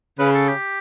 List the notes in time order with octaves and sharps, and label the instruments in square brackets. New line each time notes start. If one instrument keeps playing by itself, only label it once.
[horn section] C#3 [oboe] B4
[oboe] A4
G4